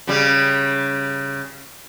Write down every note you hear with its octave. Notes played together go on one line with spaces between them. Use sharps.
C#3 G3